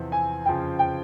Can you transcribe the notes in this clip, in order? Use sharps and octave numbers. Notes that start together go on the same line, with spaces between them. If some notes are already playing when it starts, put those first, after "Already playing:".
Already playing: E2 C3 F3 C4 E4
G#5
F2 C#3 F3 G5
G5